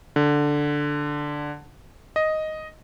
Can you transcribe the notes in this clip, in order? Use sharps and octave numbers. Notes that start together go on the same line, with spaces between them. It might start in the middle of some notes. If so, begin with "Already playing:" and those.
D3
D#5